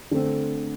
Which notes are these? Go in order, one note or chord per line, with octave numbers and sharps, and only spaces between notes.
D3 A3 C4